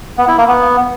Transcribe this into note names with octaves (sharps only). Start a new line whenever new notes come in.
B3
E4
A#3
B3